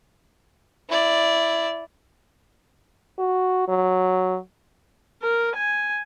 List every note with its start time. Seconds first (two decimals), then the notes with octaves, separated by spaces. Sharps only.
0.90 E4 D5
3.18 F#4
3.68 F#3
5.22 A#4
5.56 G#5